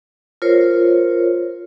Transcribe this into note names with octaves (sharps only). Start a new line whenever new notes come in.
F4 A#4 C5 C#5